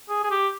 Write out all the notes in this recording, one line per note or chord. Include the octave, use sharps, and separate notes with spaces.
G#4
G#4
G4